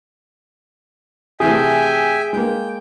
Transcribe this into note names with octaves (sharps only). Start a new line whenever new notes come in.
C3 E3 A3 G#4 E5 G5 G#5
G#3 A#3 G5